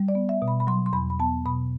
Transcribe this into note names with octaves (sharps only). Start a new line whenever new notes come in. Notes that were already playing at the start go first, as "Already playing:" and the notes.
Already playing: G3
D5
B3
E5
B2
B5
B5
F#3 C6
C6
E2 B5
B5
B3 A5
B2 B5